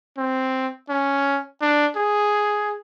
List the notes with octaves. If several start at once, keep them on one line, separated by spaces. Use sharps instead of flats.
C4
C#4
D4
G#4